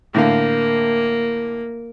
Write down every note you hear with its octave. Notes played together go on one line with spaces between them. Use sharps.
A2 D3 A#3 F5